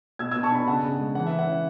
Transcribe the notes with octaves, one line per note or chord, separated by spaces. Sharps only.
B2 E6 G#6
B2 E6 G#6
A5 C#6
D4 G#5 B5
C#3 F#5 A5
C#3
G#3
E3 F#5
E3 E5
F#5
C#4